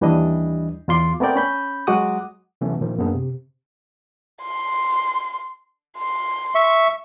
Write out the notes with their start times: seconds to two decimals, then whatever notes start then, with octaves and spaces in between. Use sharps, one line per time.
0.01 D#2 E3 G3 D4 D#5
0.88 E2 F4 C6 D6
1.20 A3 B3 C4 A#4 D5 G5
1.36 C#4 B5 G6
1.87 F#3 G#3 F#4 F#5 D6 D#6
2.61 C3 E3 F#3 A3 B3 C#4
2.80 A#2 D#3 F3
2.98 F#2 A#3 B3 D4 G#4
3.14 C3
4.43 C6
5.98 C6
6.55 E5 C#6